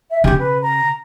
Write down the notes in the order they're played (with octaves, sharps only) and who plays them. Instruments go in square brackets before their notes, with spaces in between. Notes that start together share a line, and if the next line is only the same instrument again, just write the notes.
[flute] E5
[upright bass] C#3 C#4 [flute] G4
[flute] B4
A#5